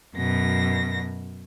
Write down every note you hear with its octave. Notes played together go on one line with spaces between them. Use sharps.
F#2 B2 A#6